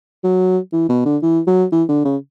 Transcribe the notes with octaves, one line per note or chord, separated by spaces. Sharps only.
F#3
E3
B2
D3
E3
F#3
E3
D3
C#3